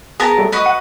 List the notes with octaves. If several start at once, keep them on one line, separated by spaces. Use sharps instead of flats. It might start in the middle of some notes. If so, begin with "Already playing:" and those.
B3 G#4 A#4 A5
F#3 G3 A3
F#4 B4 D#5
F#5